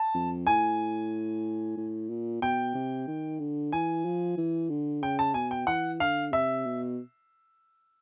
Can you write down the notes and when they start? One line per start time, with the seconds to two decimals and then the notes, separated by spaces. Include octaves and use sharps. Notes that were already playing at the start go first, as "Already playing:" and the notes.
Already playing: A5
0.14 F2
0.47 A2 G#5
1.77 A2
2.09 A#2
2.42 B2 G5
2.75 C3
3.07 D#3
3.39 D3
3.73 E3 G#5
4.05 F3
4.37 E3
4.69 D3
5.03 C#3 G5
5.19 A5
5.34 B2 G#5
5.51 G5
5.67 E3 F#5
6.00 D3 F5
6.32 C3 E5
6.65 B2